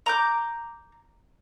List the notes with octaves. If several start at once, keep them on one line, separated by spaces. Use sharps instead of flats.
A#5 D6 G6